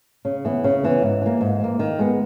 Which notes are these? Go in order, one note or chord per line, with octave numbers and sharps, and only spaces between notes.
C#3
E3 B3
C#3
E3 B3
G#2
E3 A#3
G#2
E3 A#3
D#3
G#3 B3